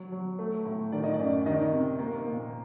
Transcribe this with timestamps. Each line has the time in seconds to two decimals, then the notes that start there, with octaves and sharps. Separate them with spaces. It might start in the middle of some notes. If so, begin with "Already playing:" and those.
Already playing: F#3
0.12 F#3
0.39 A3
0.66 A2
0.92 D#3 D5
1.04 D#5
1.14 D5
1.19 F#2
1.46 D#3 D#5
1.72 C3
1.99 A#3
2.27 A#2